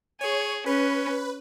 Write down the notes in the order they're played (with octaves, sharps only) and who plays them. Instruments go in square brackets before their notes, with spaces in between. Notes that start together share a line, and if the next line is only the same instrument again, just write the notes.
[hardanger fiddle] G#4 [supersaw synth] C#5
[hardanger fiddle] C#4 [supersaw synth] B4